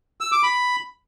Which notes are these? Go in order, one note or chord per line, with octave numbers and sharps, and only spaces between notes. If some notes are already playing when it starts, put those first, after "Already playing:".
E6
D6
B5